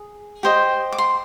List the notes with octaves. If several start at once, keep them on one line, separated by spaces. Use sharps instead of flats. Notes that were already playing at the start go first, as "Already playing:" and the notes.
Already playing: G#4
G4 C5 D#5
D6
C6